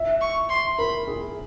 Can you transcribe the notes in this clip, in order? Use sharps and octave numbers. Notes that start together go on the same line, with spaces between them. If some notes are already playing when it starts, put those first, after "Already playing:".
Already playing: E5
C#6
C6
A#4 B5
G#4